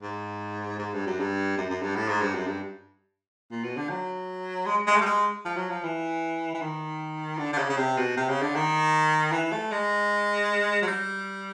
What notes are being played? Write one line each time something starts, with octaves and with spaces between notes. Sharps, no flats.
G#2
G#2
G2
F#2
G2
F#2
F#2
G2
A2
G#2
G2
F#2
G2
A#2
B2
D3
F#3
G#3
G#3
A3
G3
G#3
F3
F#3
F3
E3
E3
D#3
D3
D3
C#3
C#3
C3
B2
C3
C#3
D3
D#3
E3
A3
G#3
F#3
G3